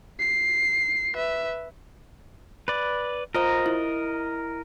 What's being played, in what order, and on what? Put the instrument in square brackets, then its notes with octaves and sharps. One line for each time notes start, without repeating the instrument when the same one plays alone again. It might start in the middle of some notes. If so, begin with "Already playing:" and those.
[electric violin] C7
B4 E5
[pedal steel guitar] B4 D5
[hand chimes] F4 C5 A#5 [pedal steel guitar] A#4 D#5
[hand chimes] E4